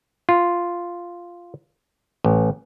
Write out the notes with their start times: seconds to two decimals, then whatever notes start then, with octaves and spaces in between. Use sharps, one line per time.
0.29 F4
2.24 A1